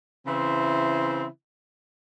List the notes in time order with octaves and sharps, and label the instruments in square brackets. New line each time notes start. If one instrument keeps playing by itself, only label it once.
[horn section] C#3 E3 C4 E4 C5